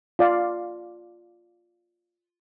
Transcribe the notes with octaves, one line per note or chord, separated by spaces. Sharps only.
F4 D5 F5